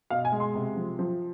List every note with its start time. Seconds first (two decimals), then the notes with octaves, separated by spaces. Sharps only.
0.10 B2 F5
0.25 G#5
0.32 G#3
0.40 C6
0.55 C3
0.76 F3
0.99 F3